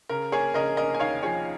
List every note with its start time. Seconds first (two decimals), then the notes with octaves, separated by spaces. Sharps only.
0.09 C#3 A#4
0.32 A#3 G#4 C#5
0.54 C#3 A#4 D#5
0.77 A#3 A#4 D#5
0.94 G#5
1.00 D#2 C#5 F5
1.23 F3 G#4 C#5